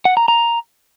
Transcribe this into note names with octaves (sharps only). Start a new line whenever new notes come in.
F#5
A#5
A#5